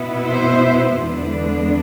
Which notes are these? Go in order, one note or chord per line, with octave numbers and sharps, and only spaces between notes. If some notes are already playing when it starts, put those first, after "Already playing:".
Already playing: B2 B3 E4
C5 E5
E2 D3 G#3 B3 D4